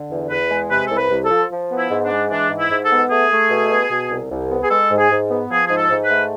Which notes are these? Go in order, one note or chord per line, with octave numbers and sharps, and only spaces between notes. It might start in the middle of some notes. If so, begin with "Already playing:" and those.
Already playing: D3
E2
E2 B4
G#3
C3 B4
C2 A4
B4
C2
A4
F3
F3
B3
E4
G#2
D4
G#3
E3 D4
G#2
E4
G#2
A4
B3
A3 G#4
A3
B2
B2
B2
C2
C2
B3
G#4
G#3 A4
G#2
G#4
G#2
B3
F3 G#4
G#2 G#4
A4
G#2
B4
A3